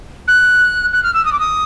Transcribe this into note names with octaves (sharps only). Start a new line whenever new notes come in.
F#6
F#6
F6
E6
D#6
D6
D#6